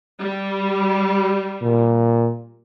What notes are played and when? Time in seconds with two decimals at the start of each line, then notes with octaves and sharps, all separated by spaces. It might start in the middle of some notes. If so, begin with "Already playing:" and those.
0.21 G3
1.62 A#2